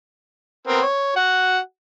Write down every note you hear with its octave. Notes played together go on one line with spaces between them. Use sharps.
B3 C4 A#4
C#5
F#4 F#5